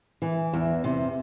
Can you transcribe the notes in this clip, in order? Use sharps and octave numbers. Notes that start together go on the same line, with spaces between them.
E3
E2
C3